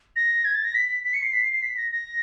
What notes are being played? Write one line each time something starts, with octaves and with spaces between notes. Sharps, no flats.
A#6
G#6
A6
A#6
B6
B6
B6
C#7
C7
B6
C7
C7
B6
A#6
A#6